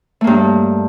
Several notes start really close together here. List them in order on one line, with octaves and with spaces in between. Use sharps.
A3 A#3 G2